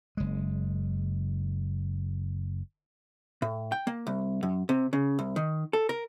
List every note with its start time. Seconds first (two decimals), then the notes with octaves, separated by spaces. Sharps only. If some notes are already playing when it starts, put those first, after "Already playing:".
0.17 F#1 G#3
3.42 A2
3.72 G5
3.87 A#3
4.07 C2
4.43 F#2
4.69 C3
4.93 C#3
5.19 C2
5.36 D#3
5.73 A4
5.89 A#4